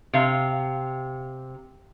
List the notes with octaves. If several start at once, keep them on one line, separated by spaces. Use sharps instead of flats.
C3 F5